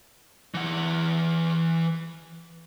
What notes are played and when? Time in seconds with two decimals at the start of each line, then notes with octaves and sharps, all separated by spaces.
0.54 E3 F#5